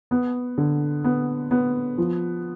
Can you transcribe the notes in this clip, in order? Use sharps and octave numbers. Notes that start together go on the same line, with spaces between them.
B3
D3
B3
B3
F3